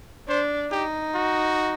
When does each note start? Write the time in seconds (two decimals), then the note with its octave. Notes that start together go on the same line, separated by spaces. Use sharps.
0.28 D4 C5
0.71 D#4 G4
1.14 F#4